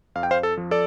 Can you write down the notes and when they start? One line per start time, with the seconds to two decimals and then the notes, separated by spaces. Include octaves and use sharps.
0.15 F2 F5
0.23 G5
0.31 C5 F5
0.43 A4
0.57 F3
0.71 A4 D5